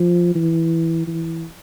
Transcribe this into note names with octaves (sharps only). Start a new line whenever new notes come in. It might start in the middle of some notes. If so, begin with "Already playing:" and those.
Already playing: F3
E3
E3